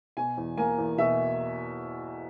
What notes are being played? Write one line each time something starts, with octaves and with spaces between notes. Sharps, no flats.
B2 G#5
E2
A#3 G#5
E2
B2 E5